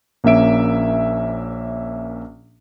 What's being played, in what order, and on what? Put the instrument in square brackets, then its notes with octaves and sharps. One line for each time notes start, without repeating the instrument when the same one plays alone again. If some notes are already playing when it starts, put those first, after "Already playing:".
[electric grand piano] A#1 A#3 C#4 E5 D7